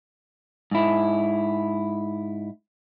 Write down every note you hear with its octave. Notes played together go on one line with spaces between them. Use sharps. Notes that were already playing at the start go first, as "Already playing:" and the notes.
G#2 E4